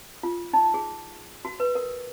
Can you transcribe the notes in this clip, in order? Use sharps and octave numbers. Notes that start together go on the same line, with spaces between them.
F4
D#4
G#4
F#4
B4
A#4